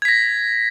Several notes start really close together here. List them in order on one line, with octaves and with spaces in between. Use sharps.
G#6 B6 A#6